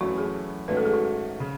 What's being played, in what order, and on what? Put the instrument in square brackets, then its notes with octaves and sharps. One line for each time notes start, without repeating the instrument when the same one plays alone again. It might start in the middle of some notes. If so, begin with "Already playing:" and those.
[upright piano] F#2 E3 A3 C#4 E4 [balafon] F#4
[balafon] G#4
[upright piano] G#2 D#3 F#3 A3 C#4 [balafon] B4
[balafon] A4
G#4
F#4
[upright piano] C#3